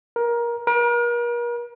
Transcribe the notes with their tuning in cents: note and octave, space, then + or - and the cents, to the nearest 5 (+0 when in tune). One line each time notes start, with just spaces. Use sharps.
A#4 +20
A#4 +40